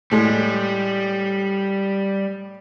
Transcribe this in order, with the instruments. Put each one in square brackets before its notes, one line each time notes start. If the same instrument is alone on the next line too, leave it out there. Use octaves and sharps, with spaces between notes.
[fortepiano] A2 G#3 [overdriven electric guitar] G3